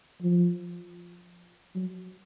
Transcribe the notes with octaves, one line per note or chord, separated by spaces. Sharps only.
F3
F#3